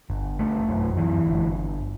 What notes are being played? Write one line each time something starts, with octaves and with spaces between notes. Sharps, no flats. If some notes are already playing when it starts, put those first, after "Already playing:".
G1
A3
F#2
E3
G1